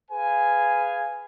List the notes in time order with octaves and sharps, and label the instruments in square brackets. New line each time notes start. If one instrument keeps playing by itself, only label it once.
[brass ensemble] G#4 B4 F5 G#5